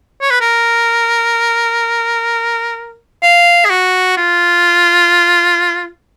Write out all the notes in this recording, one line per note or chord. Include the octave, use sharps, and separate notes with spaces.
C#5
B4
A#4
F5
G#4
F#4
F4